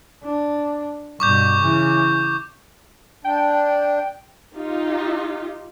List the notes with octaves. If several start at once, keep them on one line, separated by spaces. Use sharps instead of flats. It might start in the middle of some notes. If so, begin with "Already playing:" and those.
D4
G2 B2 C#6 D6 G6
C#3 E3
D4 G5
D#4 F4 G4